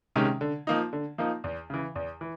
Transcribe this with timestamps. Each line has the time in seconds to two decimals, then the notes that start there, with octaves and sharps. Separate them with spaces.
0.16 C3 D#3 G#3 C#4
0.41 D3
0.67 F3 A#3 D#4
0.93 D3
1.18 F3 A#3 D#4
1.44 E2
1.70 C#3 E3
1.96 E2
2.21 E3